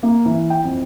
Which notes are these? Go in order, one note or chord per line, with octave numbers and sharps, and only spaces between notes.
A#3
E3
G5
F2